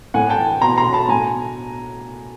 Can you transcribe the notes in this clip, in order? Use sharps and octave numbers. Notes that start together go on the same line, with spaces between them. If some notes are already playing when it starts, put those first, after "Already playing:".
A2 F#5 G#5
G5 A5
E3
B2 A#5 C6
A#5 C6
B2
A5 B5
A2 G#5 A#5